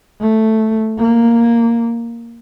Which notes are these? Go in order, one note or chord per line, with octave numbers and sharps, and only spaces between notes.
A3
A#3